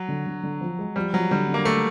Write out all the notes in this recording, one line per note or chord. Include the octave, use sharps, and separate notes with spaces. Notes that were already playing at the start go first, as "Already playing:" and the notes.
Already playing: F#3
D3
D3
D3
F3
G#3
F3 G3
F3 F#3
D3 G3
D3
A#3
D3 A3